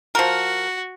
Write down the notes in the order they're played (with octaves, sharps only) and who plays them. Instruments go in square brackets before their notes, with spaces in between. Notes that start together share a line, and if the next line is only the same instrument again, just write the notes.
[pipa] F3 A#4 [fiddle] F#4